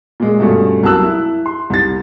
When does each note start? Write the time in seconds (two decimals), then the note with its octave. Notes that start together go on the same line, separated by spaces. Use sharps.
0.20 A#2 G#3
0.40 G2 B2 A3 C#4
0.83 C2 F#3 A#3 A5 E6 F#6
1.04 E4
1.46 C6
1.70 C2 A6